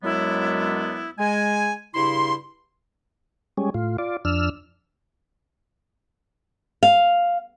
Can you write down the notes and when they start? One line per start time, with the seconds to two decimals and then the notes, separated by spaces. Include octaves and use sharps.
0.03 F#2 F#3 G#3 B3 D4 E4
1.18 G#3 G#5
1.94 G2 C#3 E4 C6
3.57 G3 G#3 C#4
3.74 A2 F4
3.98 F4 D5
4.25 F2 D4 E6 F6
6.83 F5